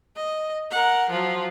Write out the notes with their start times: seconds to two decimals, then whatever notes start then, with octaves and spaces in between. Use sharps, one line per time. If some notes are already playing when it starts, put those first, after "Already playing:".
0.16 D#5
0.71 A#4 F#5
1.10 F3 F#3